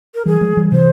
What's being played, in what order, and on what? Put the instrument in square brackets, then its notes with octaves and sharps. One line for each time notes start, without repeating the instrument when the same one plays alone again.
[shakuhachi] A#4
[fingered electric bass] E3 G3 [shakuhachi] G#4
[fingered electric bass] F3 G#3
E3 G3
[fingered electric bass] C3 E3 [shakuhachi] C5